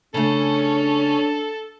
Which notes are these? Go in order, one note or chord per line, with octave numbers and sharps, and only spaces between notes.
C#3 A3 C#4 D4 A4